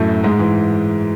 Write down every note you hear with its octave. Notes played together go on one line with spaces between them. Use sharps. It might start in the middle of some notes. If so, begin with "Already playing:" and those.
Already playing: F#2 A2 A3
G#2 G#3
E3